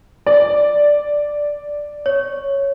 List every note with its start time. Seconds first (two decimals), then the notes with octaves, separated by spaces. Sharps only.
0.27 D5
2.06 C#5